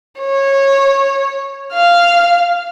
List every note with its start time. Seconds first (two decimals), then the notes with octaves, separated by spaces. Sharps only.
0.20 C#5
1.74 F5 F6